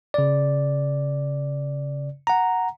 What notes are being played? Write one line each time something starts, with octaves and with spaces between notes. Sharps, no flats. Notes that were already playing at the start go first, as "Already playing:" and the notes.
C#3 D5
F#5 A#5